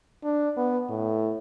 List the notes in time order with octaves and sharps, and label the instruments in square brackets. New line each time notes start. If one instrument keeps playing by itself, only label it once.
[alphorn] D4
B3
A2